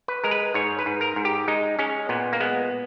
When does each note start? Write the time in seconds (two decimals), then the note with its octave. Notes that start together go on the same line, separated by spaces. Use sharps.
0.08 B4
0.24 G#3 A#4
0.31 B4
0.54 G#2 C#5
0.79 B4
0.86 G#2
1.01 A#4
1.16 G#2
1.25 G4
1.48 G#3 D#4
1.79 G#3 C#4
2.09 A#2 B3
2.33 A#3
2.40 G#3 B3